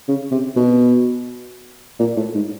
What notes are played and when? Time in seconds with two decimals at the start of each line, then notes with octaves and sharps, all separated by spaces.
0.08 C#3
0.31 C3
0.56 B2
2.00 A#2
2.17 A2
2.34 G#2